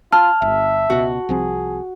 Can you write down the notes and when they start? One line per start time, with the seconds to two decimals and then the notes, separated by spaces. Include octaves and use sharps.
0.12 F4 A5 F6
0.42 G1 E5
0.90 C#2 B2 F#4
1.29 C2 F3 C4 G#4